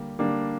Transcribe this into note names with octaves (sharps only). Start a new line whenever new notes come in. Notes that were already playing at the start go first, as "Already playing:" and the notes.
Already playing: D3 G3 A#3
D3 G3 A#3 D4